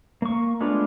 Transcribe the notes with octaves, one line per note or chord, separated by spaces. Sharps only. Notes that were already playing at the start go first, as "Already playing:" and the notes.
A#3 C#6
G#3 A3 B3 D4 F4